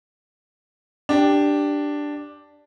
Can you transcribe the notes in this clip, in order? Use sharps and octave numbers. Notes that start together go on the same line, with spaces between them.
D4 G4